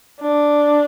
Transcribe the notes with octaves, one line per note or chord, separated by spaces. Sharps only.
D4